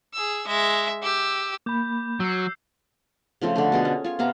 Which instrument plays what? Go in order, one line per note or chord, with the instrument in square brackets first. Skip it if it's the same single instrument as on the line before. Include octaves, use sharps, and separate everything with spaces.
[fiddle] G#4 E6
G#3 E5
G4 E6
[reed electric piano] A#3 B5 [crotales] D6 G6
[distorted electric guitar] F#3 [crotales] E6 C7
[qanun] C#3 F3 A3 C4
D3 A3
B2 G#4 C6
C#4
F4 C#5
C3 B3 F5 A#5